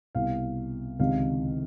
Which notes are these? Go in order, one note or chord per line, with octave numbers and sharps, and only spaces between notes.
C2 B2 F5
C#2 C3 D#3 F5